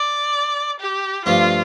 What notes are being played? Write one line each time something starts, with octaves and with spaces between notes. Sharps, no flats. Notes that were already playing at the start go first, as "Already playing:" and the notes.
Already playing: D5
G4
G2 F3 A3 D4 F4